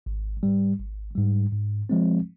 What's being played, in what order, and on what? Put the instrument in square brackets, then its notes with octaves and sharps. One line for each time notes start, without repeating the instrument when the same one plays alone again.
[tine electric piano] G#1
G#2 G3
G#1
G#2 G3
G#2
F3 G#3 C4